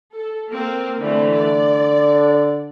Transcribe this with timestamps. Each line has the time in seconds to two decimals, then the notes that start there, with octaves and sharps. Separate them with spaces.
0.14 A4
0.52 A#3 C4
1.01 D3 E3 A3 C4
1.36 D5